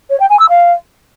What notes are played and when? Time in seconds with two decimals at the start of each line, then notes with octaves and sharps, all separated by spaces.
0.10 C#5
0.20 G5
0.30 G#5
0.39 E6
0.49 F5